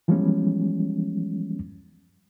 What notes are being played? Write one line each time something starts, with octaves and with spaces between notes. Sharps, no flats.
E3 F3 G3 G#3 B3 C#4